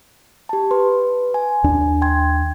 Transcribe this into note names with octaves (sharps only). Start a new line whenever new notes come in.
G4 A5
B4 C6
G#5
D#2 D4
G5 C6 G#6